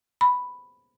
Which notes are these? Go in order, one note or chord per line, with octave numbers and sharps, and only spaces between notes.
B5